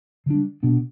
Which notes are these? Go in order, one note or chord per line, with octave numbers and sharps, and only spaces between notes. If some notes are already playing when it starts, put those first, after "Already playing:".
D3 G3 D4
B2 B3 D4